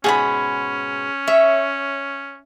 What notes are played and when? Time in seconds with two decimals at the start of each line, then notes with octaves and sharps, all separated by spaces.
0.04 G#2 B2 C#4 G#4 F#5 B5
1.28 C#5 E5